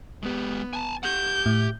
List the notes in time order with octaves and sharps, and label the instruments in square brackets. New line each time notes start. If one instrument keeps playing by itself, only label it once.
[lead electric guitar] G#3 G4 [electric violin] B3
[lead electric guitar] G#5 A5
[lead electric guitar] G4 F#5 [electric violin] G6
[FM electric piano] A2